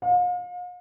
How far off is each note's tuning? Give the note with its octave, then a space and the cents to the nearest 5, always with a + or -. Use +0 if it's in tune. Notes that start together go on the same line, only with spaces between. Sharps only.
F5 +40